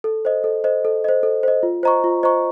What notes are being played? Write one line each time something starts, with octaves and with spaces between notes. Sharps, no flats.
A4
C5 D#5
A4
C5 D#5
A4
C5 D#5
A4
C5 D#5
F4
C5 D#5 A#5 C#6
F4
C5 D#5 A#5 C#6